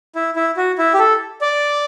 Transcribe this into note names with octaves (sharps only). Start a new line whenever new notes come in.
E4
E4
F#4
E4
G4
A4
D5